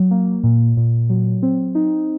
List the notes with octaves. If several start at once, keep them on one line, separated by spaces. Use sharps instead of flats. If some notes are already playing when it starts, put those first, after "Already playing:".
Already playing: F#3
A#3
A#2
A#2
F#3
C4
D#4